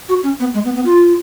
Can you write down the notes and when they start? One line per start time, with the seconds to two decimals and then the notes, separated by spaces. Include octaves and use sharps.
0.09 F#4
0.23 C#4
0.40 B3
0.54 G#3
0.65 B3
0.75 B3
0.85 F4